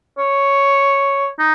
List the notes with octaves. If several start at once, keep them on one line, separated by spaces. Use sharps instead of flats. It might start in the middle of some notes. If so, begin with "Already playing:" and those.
C#5
D#4